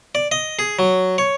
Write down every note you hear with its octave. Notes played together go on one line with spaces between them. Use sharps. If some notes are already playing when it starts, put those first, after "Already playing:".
D5
D#5
G#4
F#3
C#5